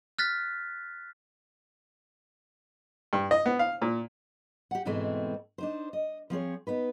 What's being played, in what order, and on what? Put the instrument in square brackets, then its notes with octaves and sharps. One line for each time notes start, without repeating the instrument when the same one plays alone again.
[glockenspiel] F6 F#6 A6 B6
[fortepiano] G2
D#5
B3
F5
A#2
[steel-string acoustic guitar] G4 F#5
G#2 B2 E3 G#3 A3 C4
D4 D#4 C5
D#5
F3 C4 G#4 C#5
B3 D#4 B4